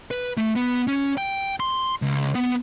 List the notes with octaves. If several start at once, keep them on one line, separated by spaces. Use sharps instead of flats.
B4
A3
B3
C#4
G5
C6
C#2
B3